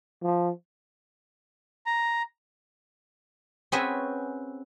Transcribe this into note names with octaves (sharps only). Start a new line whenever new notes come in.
F3
A#5
C4 C#4 F#4 G#4 B4 E5